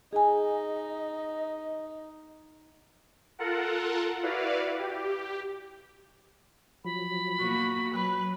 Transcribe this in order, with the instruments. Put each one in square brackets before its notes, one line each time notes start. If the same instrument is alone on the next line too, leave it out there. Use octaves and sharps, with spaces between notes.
[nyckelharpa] D#4 [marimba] G#4 G#5 [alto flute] D#5
[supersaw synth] F4 A4 A#4 F#5
E4 F#4 B4 D5 F5
G4
[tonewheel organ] F3 F#3 [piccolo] B5
[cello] B2 A#3 [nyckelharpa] F#4
[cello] F#3 [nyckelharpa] B4 [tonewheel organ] F#6